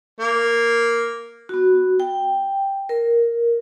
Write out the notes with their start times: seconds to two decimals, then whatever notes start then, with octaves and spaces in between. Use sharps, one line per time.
0.20 A#3
1.49 B3 F#4
2.00 G5
2.89 A#4